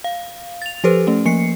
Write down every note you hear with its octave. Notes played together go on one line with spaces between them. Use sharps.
F5
A6 F7
F3 G4 A4 B4 C5
A3 C#4
F3 A#3 C7 C#7